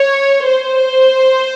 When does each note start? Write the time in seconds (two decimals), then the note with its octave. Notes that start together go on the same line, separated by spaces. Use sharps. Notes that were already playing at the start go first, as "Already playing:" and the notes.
Already playing: C#5
0.46 C5